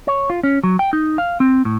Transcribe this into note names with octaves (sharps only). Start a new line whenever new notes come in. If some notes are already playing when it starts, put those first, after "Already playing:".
C#5
F4
C#4
F#3
G5
D#4
F5
C4
A2